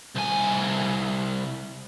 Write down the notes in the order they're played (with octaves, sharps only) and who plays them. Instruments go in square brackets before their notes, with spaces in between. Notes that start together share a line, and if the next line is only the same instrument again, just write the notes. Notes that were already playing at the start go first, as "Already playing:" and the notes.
[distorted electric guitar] C2 G#5